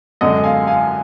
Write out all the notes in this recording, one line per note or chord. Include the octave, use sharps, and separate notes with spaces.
F#2 D3 G#3 D#5 F#5
F5 G#5
F5 G#5